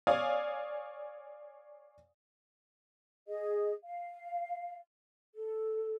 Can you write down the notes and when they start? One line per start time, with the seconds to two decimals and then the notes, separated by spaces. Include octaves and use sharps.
0.07 C#5 D5 F5 G#5 D#6
3.27 G#4 D#5
3.85 F5
5.35 A4